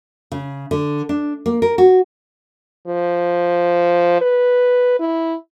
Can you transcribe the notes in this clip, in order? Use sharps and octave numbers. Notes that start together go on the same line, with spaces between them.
C#3
D3
D4
A#3
A#4
F#4
F3
B4
E4